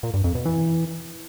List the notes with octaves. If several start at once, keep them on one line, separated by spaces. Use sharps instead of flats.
A#2
G2
F2
B2
E3